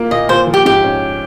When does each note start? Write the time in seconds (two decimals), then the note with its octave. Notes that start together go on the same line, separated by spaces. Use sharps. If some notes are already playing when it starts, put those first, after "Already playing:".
Already playing: A#3 F4
0.11 A#2 D#5
0.29 A#2 C5
0.47 F3
0.54 G4
0.65 G#2 G4
0.84 C#4